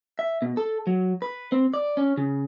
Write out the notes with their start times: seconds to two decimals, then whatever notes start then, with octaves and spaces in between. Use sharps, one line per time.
0.19 E5
0.42 B2
0.57 A4
0.87 F#3
1.22 B4
1.52 C4
1.74 D5
1.97 C#4
2.17 C#3